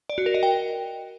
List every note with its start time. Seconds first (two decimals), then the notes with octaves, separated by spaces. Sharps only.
0.10 D5
0.18 F#4
0.26 A#4
0.34 D#5
0.43 G5